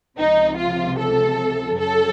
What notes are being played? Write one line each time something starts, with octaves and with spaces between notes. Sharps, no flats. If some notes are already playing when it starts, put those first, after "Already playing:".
C#2 C3 F3 D#4
F4
A4
F#2 C#3 F#3 A4